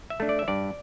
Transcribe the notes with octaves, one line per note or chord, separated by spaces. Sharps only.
E5
A3 D4
D5
E5
G2 D5